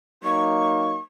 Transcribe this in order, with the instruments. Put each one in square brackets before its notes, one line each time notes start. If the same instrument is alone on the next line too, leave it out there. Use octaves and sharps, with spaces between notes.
[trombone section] F#3 A#3 D#4 [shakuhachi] C#6